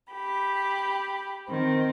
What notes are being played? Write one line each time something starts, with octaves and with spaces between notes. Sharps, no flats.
G4 B5
D#3 C4